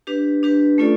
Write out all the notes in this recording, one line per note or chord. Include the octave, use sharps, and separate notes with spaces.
D4 G4 B4
D4 G4 B4
A3 C#4 F4 A4 D5